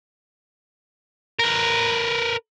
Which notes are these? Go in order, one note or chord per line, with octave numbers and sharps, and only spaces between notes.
A#4 B4